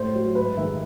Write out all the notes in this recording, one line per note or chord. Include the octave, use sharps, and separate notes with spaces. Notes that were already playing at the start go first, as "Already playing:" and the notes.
Already playing: A2 C5
F#3
G#2 B4
D#3 G#3 E5